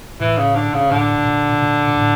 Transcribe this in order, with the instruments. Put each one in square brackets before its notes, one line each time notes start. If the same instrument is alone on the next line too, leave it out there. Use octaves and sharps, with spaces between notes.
[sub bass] A2 [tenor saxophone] E3
[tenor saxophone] C#3
D3
C#3
[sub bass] A2 [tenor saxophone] D3
[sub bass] A#2
A#2
A2